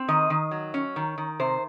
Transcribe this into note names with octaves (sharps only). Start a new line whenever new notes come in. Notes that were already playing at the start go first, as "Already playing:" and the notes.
Already playing: C4
D#3 D#5
D#3
F#3
C#4
D#3
D#3
C3 C5